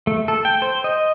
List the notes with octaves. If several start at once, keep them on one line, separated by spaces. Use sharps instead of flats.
A3
A4
G5
C5
D#5